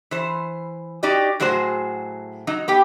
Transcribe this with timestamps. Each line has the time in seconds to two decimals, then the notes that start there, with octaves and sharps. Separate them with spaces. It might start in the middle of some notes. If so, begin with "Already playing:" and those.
0.11 E3 C5
1.03 D#4 F#4 G4 D5 D#5
1.40 A2 F#3 F#4 G#4 C5
2.47 F#3 D#4
2.68 B3 G4 G5